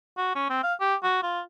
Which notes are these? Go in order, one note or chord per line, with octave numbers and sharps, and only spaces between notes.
F#4
C#4
C4
F5
G4
F#4
F4